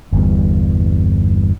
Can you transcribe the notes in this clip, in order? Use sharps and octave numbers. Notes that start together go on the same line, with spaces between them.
G1 E2 G2